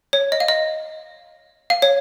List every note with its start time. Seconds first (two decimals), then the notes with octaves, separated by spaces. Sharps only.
0.13 C#5
0.32 D#5
0.40 F5
0.48 D#5
1.70 F5
1.82 C#5